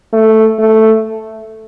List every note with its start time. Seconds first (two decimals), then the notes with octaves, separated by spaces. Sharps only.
0.13 A3
0.59 A3